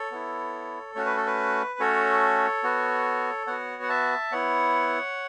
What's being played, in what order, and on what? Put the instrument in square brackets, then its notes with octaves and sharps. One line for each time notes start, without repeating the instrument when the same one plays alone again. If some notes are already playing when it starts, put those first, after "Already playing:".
Already playing: [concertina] A4 C#5
B3 E4
A3 C#4 F#4 C#5
B4
A4
B4
A3 C#4 F#4 A4 C#5
B3 F#4
B3 F#4 C#5 F#5
F#5
E5 A5
B3 E4 C#5 F#5